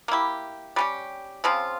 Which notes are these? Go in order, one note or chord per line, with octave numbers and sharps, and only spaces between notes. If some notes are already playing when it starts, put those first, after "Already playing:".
A#3 E4 G4
G3 C#4 G4
C#3 F3 C4 F4